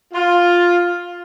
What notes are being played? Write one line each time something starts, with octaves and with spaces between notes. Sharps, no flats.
F4